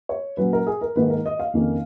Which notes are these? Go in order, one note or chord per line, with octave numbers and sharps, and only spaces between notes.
C#5
A#2 F#3 C#4 B4
A#4
G#4
A#4
G#2 D#3 A#3 B4
A#4
D#5
F5
F2 D#3 A#3 C#4